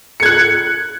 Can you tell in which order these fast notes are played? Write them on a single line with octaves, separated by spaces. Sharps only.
C#7 G#6 F#6